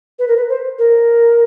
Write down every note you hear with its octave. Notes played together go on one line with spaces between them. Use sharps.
B4
A#4
B4
C5
A#4